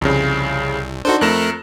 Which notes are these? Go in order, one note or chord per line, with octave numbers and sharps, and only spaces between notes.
C2 F2 C#3
D4 D#4 F#4 A4 C5
F2 A3 A#4 F#6 A#6 E7